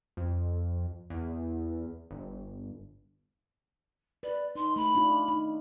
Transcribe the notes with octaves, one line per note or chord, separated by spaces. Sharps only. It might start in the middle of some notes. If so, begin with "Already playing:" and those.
F2
E2
G1
B4 D5
D#4 C6
A3 B5
D4 D#4 F4
D#4